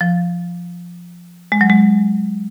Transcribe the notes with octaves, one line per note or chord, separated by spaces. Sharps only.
F3
G#3
F#3
G#3